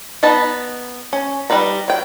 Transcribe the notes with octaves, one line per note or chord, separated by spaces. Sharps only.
B3 D#4 A5 B5
C#4
G3 D#4 B4 A#5
F#3 G5